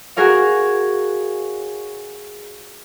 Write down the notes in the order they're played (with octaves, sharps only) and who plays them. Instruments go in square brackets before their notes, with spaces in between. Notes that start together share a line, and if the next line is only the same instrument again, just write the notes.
[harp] F#4 G#4 A#4 C#5 F5